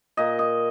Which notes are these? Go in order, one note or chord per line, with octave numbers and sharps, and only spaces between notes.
A#2 D#5
D#5